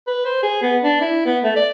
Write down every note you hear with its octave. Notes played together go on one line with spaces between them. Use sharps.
B4
C5
G#4
B3
D4
E4
B3
A3
D5